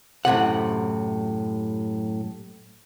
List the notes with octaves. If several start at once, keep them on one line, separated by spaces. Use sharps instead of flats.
F#2 A2 C3 F#5